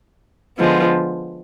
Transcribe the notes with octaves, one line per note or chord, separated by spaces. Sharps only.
D3 F3 G#3 B3